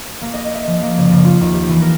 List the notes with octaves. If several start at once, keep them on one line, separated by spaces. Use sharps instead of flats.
A#3
D#5
E5
F3
A#3
F#1
F#1
F4
D#2
G4
E3
A#4